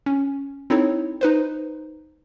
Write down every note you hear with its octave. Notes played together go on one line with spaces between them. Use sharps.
C#4
C4 D#4 E4 A4 C#5
D#4 B4 C5